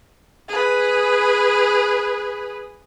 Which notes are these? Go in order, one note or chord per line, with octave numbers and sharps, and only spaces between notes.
G#4 B4